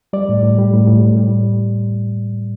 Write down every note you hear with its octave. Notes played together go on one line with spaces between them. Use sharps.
G3 D5
A2
A2
G3
A2
A2
A2
G3